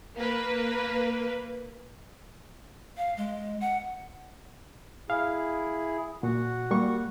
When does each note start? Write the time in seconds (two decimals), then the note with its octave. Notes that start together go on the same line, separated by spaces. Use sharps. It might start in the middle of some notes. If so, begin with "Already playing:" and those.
0.17 A#3 B4
2.97 F5
3.17 G#3
3.61 F#5
5.10 E4 G#4 F5
6.23 A#2 F#4 F#5
6.71 G3 A#3 C#6